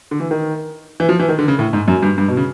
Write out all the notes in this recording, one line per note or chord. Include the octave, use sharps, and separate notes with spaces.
D3
E3
D#3
E3
F3
E3
D#3
D3
C#3
A2
G#2
F#2
G2
G2
B2
C#3